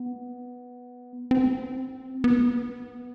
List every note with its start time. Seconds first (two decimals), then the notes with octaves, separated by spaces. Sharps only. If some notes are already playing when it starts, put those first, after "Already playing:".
Already playing: B3
1.31 C4
2.24 B3